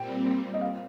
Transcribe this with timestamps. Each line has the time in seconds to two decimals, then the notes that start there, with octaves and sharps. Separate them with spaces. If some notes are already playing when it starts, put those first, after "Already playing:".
Already playing: A#2 G3 C4 G5
0.54 D#5
0.61 F5